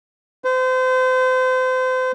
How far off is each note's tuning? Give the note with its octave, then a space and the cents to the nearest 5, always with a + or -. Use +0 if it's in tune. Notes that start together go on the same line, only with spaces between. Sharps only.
C5 -35